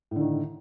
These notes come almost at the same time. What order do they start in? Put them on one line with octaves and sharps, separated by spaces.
A2 D3 D#3